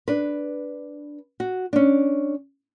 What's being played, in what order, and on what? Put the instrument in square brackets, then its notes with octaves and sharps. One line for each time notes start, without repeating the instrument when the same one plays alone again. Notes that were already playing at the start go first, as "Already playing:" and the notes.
[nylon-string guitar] D4 B4
F#4
C#4 D4